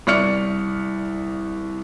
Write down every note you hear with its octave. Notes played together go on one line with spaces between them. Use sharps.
C2 D5 C#6 F6 C#7